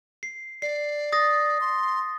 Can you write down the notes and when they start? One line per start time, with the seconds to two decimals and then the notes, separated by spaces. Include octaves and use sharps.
0.23 C7
0.62 D5 C7
1.12 D#6 A6 A#6
1.61 C6